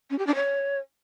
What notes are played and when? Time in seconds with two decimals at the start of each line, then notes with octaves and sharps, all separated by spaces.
0.10 C#4
0.19 G4
0.27 D4
0.35 C#5